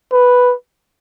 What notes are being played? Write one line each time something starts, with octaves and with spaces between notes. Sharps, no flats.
B4